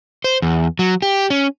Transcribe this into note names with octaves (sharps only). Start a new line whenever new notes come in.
C5
E2
F#3
G4
C#4